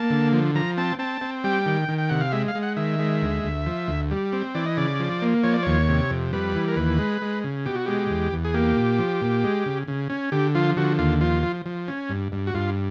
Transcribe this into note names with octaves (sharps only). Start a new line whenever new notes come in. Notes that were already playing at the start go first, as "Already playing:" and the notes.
Already playing: A#3 A5
D3
F3
F3 A#5
C4 A5
C4 A5
C4
G3 G5
D#3
D#3
G5
C3 F#5
F5
G#3 E5
F5
G#3
F#5
D#3 E5
G#3
D2
D2
F3
D2
G3
C4
E3 D5
D#5
C#3 D5
F3
A#3
F3 C#5
D5
D#2 C#5
C3
F2
G3 B4
E3
A#4
D#2 B4
G#3
G#3
C#3
B2 G4
F#4
G#3 G4
E2
E2
G#4
A#3 G4
A#2
F3
A#2
G#3
C#3
C#3
C#4
D3 G4
F3 F4
D3 F#4
D#2 F4
F3 F4
F3
F3
C#4
G2
G2
F#4
G2 F4